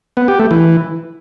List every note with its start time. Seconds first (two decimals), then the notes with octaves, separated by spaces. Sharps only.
0.17 B3
0.28 G4
0.39 A3
0.51 E3